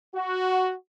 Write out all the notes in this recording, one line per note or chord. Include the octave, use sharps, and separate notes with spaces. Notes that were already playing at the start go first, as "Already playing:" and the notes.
F#4